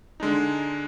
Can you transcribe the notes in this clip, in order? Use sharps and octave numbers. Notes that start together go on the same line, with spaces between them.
D3 G#3 D4 D#4